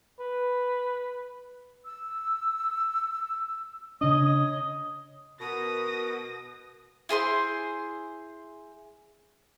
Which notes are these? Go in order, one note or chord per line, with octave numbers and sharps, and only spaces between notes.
B4
E6
C#3 D4 C#5 D#5
B2 A#4 D#6 A#6
E4 G#4 C5 C6